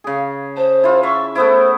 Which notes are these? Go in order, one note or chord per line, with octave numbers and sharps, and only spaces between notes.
C#3 G#4
C5 A5
E4 F4
E5 C#6
A3 B3 E4 C5